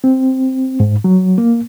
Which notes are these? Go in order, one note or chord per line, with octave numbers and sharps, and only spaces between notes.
C4
G#2
F#3
A#3